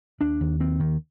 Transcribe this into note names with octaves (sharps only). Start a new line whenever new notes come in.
D#2 D4
D#2
D#2 C4
D#2 D#3